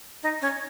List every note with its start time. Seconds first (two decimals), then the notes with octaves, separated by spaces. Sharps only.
0.23 D#4
0.42 C#4